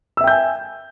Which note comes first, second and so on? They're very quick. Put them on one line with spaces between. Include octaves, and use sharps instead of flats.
E6 E5 G5 G6 G#5